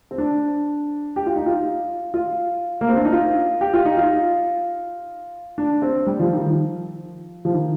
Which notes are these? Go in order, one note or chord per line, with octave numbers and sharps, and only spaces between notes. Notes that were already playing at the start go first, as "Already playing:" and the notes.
C4
D4
G4
F4
D#4
F4
F4
A#3
C4
D4
D#4
F4
G4
F4
D#4
F4
D4
C4
G3
F3
D#3
F3
F3
D#3